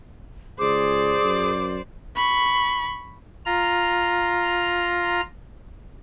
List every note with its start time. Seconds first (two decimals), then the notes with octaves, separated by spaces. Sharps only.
0.59 C#2 G#4 C5 D5 D6
1.23 F#2
2.16 B5 C#6
3.46 F4 A#5